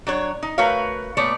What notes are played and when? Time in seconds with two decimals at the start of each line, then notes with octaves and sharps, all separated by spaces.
0.07 F#3 D4 C#5
0.43 D#4
0.58 A3 F#4 A#4 B4 C#5 F5
1.17 A#2 A3 B3 C#5 D5